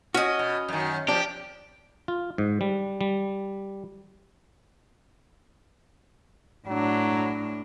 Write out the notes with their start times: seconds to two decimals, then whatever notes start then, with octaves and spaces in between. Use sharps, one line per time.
0.15 C#4 F#4 D#5
0.39 B2
0.69 F#2 D#3
1.08 F3 D4 G4
2.08 F4
2.38 G#2
2.61 G3
3.01 G3
6.67 A2 F#3 D4